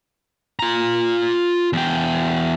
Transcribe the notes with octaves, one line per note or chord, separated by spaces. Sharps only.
F4 A#5
E2 G5